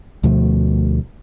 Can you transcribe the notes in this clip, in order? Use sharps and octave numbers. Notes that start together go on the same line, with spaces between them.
D2 B2 F3 A3